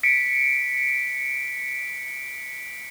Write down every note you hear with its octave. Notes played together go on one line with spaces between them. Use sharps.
B6 C#7 D7